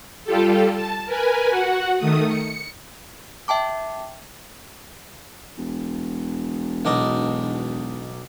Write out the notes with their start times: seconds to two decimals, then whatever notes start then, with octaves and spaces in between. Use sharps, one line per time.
0.25 G3 F4 G4 A4
0.73 A5
1.06 A#4 B4 G#5
1.49 F#4 F#5
1.98 D#3 A3 D#6
2.27 C#7
3.48 E5 G5 A5 D6
5.57 E1
6.85 B1 D4 D#4